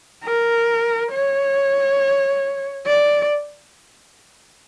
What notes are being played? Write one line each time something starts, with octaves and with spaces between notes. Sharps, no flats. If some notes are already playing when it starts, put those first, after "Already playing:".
A#4
C#5
D5